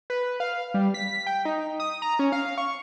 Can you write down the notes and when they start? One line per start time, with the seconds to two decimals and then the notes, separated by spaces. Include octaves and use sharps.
0.10 B4
0.40 F5
0.74 G3
0.94 B6
1.27 G5
1.45 D#4
1.80 D#6
2.02 A#5
2.19 C#4
2.32 F5
2.58 C#6